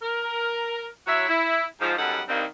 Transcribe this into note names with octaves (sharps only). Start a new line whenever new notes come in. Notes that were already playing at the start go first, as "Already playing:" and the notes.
A#4
F#3 E4 F#4 C#5 E5
E4
G#2 F3
F#2 G3 B3 D#4 A4 F#5
G2 D#3 G3 A#3 C4 D#4